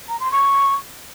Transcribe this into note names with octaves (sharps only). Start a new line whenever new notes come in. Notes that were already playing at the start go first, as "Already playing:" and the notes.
A#5
C6
C#6